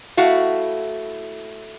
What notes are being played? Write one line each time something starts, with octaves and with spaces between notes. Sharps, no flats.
A3 E4 F#4 F5